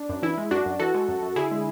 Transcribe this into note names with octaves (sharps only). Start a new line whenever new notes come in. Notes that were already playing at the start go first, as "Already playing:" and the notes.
Already playing: D4
F#2
E3 E4
G#3
F#2 D4 F#4
F#2
E3 F#4 A4
G#3
F#2
F#2
D3 E4 G#4
G#3